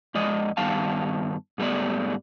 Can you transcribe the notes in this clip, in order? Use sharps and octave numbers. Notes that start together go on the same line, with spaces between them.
F2 G#3 D5 D#5
G2 D#3 G3 B3 F5 A5
G#2 G3 A3 B3 D5